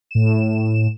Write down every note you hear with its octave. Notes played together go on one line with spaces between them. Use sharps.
A2 E7